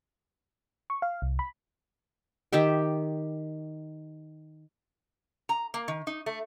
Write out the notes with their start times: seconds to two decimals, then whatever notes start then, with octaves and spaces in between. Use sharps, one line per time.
0.90 C#6
1.02 F5
1.22 C2
1.39 B5
2.53 D#3 G4 E5 G5
5.49 A#5
5.74 A#3
5.88 D#3
6.07 D#4
6.26 A3